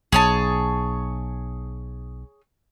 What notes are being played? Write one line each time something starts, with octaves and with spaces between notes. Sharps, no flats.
B1 G#4 C#5 A5